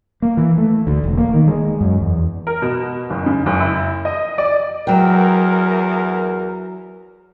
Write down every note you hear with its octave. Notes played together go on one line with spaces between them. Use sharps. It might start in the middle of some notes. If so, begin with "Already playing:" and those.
A#3
E3
A3
D2
E1
A#3
D#3
G#3
F#2
E2
A#4
B2
F#1
C#3
F#1
E4
D#5
D5
E2 F#3 A#4 G5